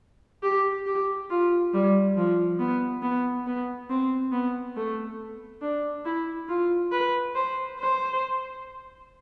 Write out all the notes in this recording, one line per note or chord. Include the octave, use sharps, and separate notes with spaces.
G4
G4
F4
G3
F3
B3
B3
B3
C4
B3
A3
D4
E4
F4
B4
C5
C5